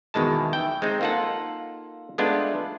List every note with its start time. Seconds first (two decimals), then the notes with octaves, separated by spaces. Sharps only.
0.14 E2 B2 D#3 G#3 A5
0.53 E5 G5
0.82 G#3 C4 D#4
1.01 A#3 D#4 F4 A4 F#5
2.18 G#3 A3 B3 D4 F4